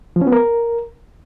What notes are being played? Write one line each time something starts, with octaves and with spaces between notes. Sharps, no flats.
F3
C#4
B3
A#4